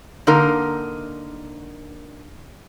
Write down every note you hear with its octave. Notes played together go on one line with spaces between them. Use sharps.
D3 A#3 D#4 A#4